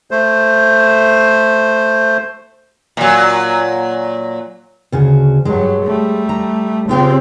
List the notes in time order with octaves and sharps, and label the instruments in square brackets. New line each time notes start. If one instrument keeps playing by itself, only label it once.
[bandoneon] A3 C5
[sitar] A#2 F#3
[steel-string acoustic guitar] D2 C#3 F#4
[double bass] G2 F#3 [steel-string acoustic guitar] G#3
[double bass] G3 A3
[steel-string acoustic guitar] A#5
[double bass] C#3 C4 [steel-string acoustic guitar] F4 G4 F5